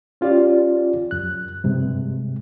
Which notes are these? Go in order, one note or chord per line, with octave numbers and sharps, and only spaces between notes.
C#4 F4 G4 D5
F#2 F#6
G2 C3 G#3